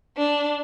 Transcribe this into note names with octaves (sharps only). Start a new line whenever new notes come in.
D4